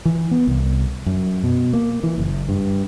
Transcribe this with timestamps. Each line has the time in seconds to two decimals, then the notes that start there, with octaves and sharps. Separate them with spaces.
0.05 E3
0.31 B3
0.47 C2
1.06 F#2
1.44 B2
1.73 A#3
2.03 E3
2.18 F#1
2.49 G2